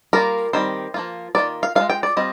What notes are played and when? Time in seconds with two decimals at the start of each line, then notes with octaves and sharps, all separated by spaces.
0.13 G3 A#3 F4 A#4
0.53 D#3 G3 C4 C5
0.94 F3 A#3 F4
1.35 D#3 A#3 F4 D5
1.63 F5
1.75 D4 F4 F5
1.80 G#3
1.90 G5
2.03 D5
2.17 G3 C4 F4 D#5